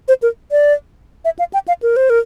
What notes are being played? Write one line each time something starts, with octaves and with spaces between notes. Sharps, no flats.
C5
A#4
D5
E5
F5
G5
F5
A#4
C5
A#4